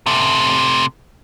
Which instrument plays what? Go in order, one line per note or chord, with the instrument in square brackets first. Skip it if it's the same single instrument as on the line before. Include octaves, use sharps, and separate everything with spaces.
[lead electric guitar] C3 A3